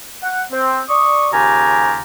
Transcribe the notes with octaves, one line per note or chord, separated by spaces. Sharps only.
F#5
C4
D5 C#6 D#6
D#2 C#3 F4 G4 G#5 A#5